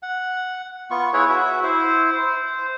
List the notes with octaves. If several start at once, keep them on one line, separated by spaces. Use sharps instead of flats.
F#5
B3 F4 C#6
E4 G#4 B4 C#5
F#4 E5
E4 C5
C5